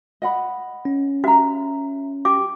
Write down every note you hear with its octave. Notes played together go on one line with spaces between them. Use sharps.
D#5 F#5 B5
C#4
F#4 E5 A#5
G4 D6